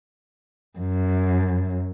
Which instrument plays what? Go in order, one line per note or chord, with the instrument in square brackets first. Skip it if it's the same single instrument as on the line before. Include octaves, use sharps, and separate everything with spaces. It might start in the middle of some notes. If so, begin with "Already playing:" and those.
[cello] F#2